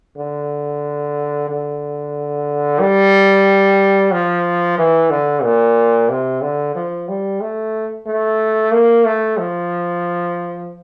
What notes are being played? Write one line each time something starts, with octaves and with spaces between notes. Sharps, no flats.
D3
D3
G3
F3
E3
D3
A#2
C3
D3
F3
G3
A3
A3
A#3
A3
F3